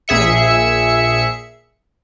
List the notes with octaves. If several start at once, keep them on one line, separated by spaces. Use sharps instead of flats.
A#1 G#4 E5 C#7